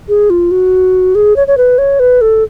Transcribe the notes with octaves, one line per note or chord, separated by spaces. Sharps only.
G#4
F4
F#4
G#4
C#5
C#5
B4
C#5
B4
A4